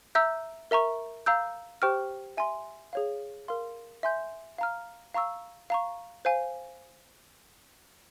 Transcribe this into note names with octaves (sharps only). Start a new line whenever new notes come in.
E5 A#5 E6 G6
A#4 E5 A#5 C#6
F5 A#5 E6 G6
G4 C5 G5 C#6 F6
E5 G#5 C6
G#4 C#5 F5
A#4 F5 C6
E5 G#5 C6 G6
F5 A#5 F6
F5 A#5 C#6 E6
F5 A#5 C#6
C5 F5 G#5